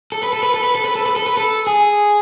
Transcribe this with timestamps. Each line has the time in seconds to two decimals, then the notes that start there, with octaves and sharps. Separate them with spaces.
0.12 A4
0.23 B4
0.33 A4
0.43 B4
0.54 A4
0.64 B4
0.75 A4
0.85 B4
0.95 A4
1.06 B4
1.16 A4
1.27 B4
1.37 A4
1.67 G#4